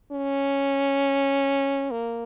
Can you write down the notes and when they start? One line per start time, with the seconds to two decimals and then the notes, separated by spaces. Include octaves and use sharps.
0.12 C#4
1.91 A#3